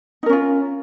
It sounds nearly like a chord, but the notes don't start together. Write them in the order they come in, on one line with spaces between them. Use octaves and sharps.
D#4 A#4 C#4 F4